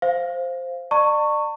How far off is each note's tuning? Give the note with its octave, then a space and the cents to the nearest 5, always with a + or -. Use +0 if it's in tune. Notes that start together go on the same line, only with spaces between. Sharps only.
C5 +0 F5 -5
D5 +35 A5 +45 C#6 +0